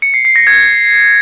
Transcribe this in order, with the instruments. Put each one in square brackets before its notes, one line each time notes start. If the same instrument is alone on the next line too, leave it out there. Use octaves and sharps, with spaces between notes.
[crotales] C#7
C7
C7
A#6
G#6